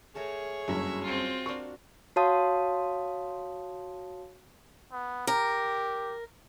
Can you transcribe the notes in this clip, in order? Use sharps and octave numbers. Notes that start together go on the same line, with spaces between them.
A3 G#4 A#4 C#5 A5
F#1 G2 C#4 F#4 E5 B5
C4 F4
D4 F#4 A#4 C#6
F#4 C#5 F5 A5 C6 D#6
B3
G4 A#4